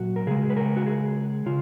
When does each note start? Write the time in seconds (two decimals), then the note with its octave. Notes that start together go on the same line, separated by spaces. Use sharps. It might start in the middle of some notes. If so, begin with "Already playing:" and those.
Already playing: A#2 F#3 F#4
0.16 A#4
0.27 C#3 G#3 G#4
0.50 B4
0.57 A#4
0.77 F#4
0.87 G#4
1.46 C#3 F4